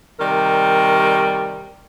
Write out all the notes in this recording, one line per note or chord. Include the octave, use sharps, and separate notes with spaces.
C3 D#3 G3 A#4